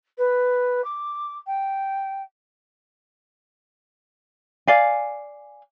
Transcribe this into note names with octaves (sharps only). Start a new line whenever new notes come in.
B4
D6
G5
D5 F5 G#5